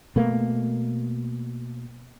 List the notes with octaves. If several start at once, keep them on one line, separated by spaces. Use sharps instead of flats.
B2 A3 A#3